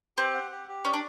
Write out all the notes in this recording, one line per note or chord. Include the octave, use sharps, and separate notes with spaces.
C4 G4
F#5
G4
G4
C#4 D5
D4